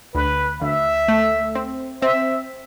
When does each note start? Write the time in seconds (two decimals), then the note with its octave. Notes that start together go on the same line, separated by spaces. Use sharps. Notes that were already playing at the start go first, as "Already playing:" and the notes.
0.14 D2 B4
0.61 D2 E5
1.08 A3
1.55 C4
2.02 C4 E5